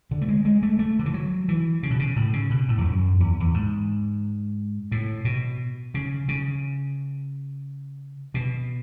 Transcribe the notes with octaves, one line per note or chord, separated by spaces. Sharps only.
D3
A3
G#3
G#3
A3
A3
D3
E3
F#3
E3
C#3
B2
C#3
A2
C#3
B2
A2
E2
F#2
E2
E2
G#2
A2
B2
C#3
C#3
B2